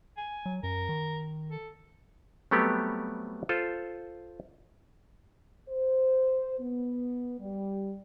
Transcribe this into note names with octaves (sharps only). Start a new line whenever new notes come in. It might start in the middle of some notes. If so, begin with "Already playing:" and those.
G#5
F#3
F#2 A#4
D#3
A4
F#3 G3 A3 B3 C4 G4
F4 A4 C5
C5
B3
G3